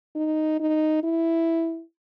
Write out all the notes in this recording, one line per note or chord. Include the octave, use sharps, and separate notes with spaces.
D#4
D#4
E4